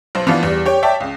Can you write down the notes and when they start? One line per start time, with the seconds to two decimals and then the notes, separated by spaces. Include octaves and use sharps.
0.15 B1 C5
0.27 E3 F3 B3 D4 F4
0.43 E2 G3
0.65 G4 C#5 G5
0.83 C#5 D5 E5 G5 A5
1.00 C#2